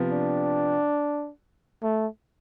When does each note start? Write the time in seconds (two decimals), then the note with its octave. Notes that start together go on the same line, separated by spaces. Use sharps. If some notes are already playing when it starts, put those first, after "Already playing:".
Already playing: C3 F3 B3
0.12 D4
1.83 A3